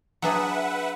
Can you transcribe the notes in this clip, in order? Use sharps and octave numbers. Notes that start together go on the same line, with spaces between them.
F#3 D4 G#4 B4 E5 F#5